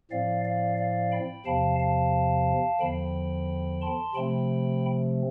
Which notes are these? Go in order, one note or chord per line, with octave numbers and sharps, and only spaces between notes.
A2 F3 C4 D5 F5
D5 F5
D5 F5
G5 B5
E2 C3 F3 F5 A5
F5 A5
E2 D3 F3 G5 B5
A5 C6
C3 F3 A3 C4 G5 B5